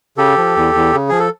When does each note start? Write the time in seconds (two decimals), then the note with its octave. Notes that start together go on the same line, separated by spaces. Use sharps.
0.18 C#3 G4 A4
0.38 F3
0.56 E2
0.75 E2
0.93 C#3
1.09 F3 G#4
1.19 A4